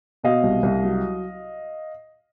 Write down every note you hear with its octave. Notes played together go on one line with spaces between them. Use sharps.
B2 D#5 F5
C2
C2
F#3